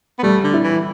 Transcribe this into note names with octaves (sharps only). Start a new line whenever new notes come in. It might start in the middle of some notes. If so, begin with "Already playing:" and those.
B3
G3 A3
D3
E4
E3